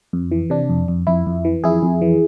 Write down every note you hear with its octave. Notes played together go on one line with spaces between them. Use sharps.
F2
E3
C3 D4
F2
F2
F2 E4
F2
E3
F2 E4 G#4
F2
E3